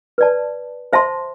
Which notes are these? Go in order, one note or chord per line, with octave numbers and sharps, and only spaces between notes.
B4 D5 A5
C5 E5 A5 C6